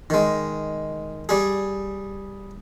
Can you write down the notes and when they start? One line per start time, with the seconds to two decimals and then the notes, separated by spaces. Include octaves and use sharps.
0.10 D#3 G#3
1.29 G3 G#4